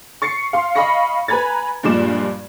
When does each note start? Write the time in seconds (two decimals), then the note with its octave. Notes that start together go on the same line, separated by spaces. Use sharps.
0.22 C#6 A6 C7 C#7
0.53 F5 C6
0.75 D#5 F5 B5 C#6 A#6 C#7
1.28 B4 G#5 A#5 B5 G#6 A6
1.83 G2 A#2 F3 G#3 D6 E7